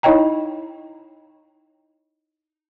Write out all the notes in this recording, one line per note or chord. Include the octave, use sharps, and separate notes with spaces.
D#4 E4 C#5 D#5 G5 A#5